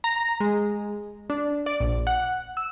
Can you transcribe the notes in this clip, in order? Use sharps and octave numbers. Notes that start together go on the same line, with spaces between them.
A#5
G#3
D4
D5
A#1
F#5
E6